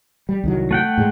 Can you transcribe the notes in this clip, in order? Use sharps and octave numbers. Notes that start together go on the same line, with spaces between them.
G3
C2 D#3 F#3
A3 F#5 G5
G#2 G#3